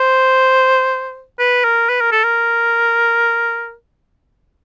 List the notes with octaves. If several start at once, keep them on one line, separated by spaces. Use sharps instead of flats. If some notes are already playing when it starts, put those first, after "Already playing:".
Already playing: C5
B4
A#4
B4
A#4
A4
A#4